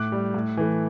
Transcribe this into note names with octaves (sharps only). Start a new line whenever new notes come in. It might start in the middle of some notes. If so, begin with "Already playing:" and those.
Already playing: A2 D6 F#6
G3
A2
E3 A3